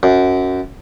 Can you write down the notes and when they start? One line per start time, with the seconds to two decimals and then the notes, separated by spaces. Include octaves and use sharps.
0.03 F#2